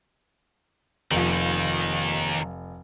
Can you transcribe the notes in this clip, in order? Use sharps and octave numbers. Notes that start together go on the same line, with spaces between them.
F1 D#2 D#3 F4